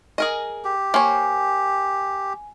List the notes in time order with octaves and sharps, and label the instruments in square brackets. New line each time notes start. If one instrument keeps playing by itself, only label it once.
[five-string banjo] G#4 A#4 D#5
[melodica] G4
[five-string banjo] A#3 C5 C#5 [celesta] G#5